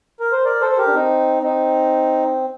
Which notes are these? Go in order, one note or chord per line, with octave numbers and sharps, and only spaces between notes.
A#4
C5
A#4 D5
A4 C5
C5
G4 A#4
D4
C4 D#4
C4 D#4